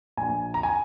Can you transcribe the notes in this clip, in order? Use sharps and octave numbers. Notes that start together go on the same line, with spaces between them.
A#1 G#5
A#5
G#5